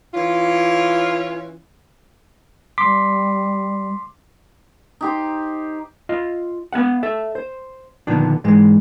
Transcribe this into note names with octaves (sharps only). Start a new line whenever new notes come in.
E3 C#4 F4
G3 C6 D6 B6
D#4 G4 C5
F4 D#5
B3 F5 F#5
A4 E5
C5
A#2 D3 D#3 F3 B3 D4
G#2 E3 G#3